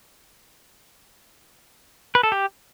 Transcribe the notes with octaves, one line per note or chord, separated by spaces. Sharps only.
B4
A4
G4